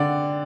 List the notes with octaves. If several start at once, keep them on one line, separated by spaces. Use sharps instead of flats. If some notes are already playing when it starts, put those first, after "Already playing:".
Already playing: D3 D5 F#5 G5